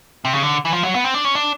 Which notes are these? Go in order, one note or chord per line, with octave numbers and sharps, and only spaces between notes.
C3
C#3
D3
E3
F3
F#3
B3
C4
D4
C#4
D4